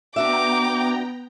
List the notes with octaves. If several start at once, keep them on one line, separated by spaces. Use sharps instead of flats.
B3 D4 F#4 E5 G5 A#5 D6